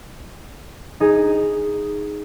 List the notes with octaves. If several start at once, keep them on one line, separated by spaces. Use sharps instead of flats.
D#4 G#4